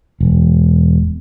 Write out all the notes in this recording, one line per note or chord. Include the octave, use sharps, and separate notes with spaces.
E1